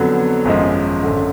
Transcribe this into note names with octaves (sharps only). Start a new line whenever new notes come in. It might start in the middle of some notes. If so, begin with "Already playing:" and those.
Already playing: F2 D3 F#3 B3
G#1 F#2 F3 G#3
G#1 F#2 D3